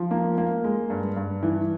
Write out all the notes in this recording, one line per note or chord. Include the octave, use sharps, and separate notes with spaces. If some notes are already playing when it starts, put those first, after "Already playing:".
Already playing: F3
A#3
A#3
G#3
G2
G2
E3